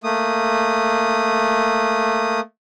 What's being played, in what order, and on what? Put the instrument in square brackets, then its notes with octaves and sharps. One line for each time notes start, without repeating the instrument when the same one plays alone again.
[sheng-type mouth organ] A3 A#3 D#6